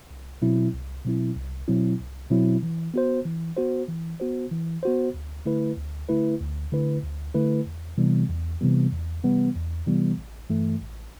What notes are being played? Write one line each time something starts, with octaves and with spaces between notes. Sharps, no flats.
C2
B2 F#3 C4 E4
C2
B2 F#3 C4 E4
C2
B2 F#3 C4 E4
C2
B2 F#3 C4 E4
E3
B3 F#4 C5
E3
B3 F#4 C5
E3
B3 F#4 C5
E3
B3 F#4 C5
D2
D3 A3 E4 B4
D2
D3 A3 E4 B4
D2
D3 A3 E4 B4
D2
D3 A3 E4 B4
E2
C3 E3 G3 B3
E2
C3 E3 G3 B3
E2
C3 E3 G3 B3
E2
C3 E3 G3 B3
A1
G2 E3 A3
A1